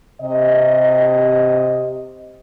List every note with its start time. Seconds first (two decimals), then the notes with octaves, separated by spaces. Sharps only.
0.22 C3 D#5